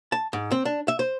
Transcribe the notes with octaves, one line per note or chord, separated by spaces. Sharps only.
A5
G#2
C4
D4
E5
C5